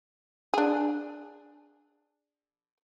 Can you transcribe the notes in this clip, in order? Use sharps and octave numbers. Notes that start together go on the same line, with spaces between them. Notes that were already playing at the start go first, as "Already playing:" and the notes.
D4 G#4